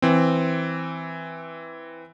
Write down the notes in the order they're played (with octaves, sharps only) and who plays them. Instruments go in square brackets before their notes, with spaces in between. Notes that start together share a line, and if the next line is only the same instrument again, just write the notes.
[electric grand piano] E3 C4